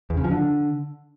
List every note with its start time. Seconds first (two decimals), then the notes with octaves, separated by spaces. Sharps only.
0.10 E2
0.17 C#3
0.24 F3
0.31 D3